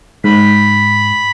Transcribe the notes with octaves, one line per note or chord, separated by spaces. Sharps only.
G#2 B5